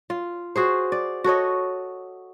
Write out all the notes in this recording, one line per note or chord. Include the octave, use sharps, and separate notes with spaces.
F4
F#4 G#4 C5
D5
F#4 A4 C#5 D#5